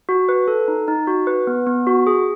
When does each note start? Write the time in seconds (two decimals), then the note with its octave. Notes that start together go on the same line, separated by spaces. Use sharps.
0.09 F#4
0.29 B4
0.47 A4
0.68 D#4
0.88 D#4
1.07 F#4
1.27 B4
1.47 B3
1.67 B3
1.87 F#4
2.07 G#4